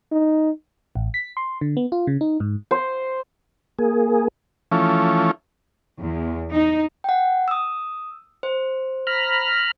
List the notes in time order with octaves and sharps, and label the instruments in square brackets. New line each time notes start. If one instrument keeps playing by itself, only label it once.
[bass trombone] D#4
[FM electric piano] A1
B6
C6
D3
B3
F4
C#3
D#4
G#2
[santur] C5
[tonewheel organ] A#3 G#4
[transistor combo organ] E3 F3 A3 C#4
[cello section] E2
D#4
[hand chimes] F#5 G5
D#6 E6
C5
[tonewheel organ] A#5 B5 F6